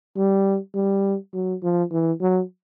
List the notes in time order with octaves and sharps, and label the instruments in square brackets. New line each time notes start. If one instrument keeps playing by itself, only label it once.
[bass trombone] G3
G3
F#3
F3
E3
F#3